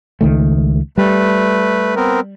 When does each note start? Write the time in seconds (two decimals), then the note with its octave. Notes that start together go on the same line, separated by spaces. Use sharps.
0.21 C#2 D#3 A3
0.98 G3 A3 B4
1.96 B3 C4 A#4